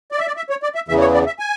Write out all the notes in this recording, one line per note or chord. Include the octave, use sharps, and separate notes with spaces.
D5
E5
D5
E5
C#5
D5
E5
E2 C#3 E3 E5
C#5
D5
E5
G#5